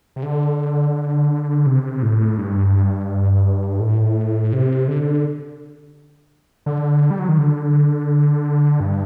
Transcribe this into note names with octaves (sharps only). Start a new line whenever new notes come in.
C3
D3
C3
A2
G2
A2
C3
D3
D3
G3
F#3
D#3
D3
G2